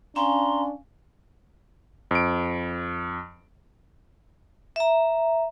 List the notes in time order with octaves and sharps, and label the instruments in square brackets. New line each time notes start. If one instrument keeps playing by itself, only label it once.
[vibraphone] C#4 F5 G#5 [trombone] D4 [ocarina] A#5 [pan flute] C6
[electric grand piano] F2 D7
[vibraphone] E5 A#5